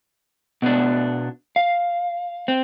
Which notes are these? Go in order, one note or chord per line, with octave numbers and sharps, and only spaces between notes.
B2 B3 D4
F5
C4